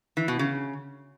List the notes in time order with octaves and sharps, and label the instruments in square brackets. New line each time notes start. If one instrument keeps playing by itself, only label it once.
[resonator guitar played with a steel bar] E3
B2
C#3